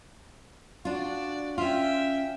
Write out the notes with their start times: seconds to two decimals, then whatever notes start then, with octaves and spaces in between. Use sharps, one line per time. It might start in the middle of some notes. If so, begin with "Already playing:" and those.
0.85 D4 F4 F#4 D5
1.58 C#4 F4 E5 G5